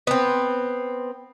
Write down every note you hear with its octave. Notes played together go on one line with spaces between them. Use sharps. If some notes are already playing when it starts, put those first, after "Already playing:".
B3 C4